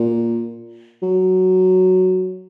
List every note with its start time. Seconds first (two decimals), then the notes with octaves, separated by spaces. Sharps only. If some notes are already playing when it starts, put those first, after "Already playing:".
Already playing: A#2
1.03 F#3